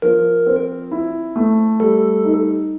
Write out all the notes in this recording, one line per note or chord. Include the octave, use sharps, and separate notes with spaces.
F3 A#4
C4
E4
A3
G3 A4
D#4